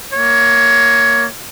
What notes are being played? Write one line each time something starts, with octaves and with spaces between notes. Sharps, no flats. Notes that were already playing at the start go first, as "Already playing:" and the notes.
A#3 C#5